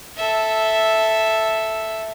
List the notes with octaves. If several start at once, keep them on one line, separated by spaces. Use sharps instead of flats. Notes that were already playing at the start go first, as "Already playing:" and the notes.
A4 E5